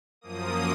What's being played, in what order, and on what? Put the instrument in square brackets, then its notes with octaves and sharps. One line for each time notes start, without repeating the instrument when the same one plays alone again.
[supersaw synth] F#2 F3 A#3 D#6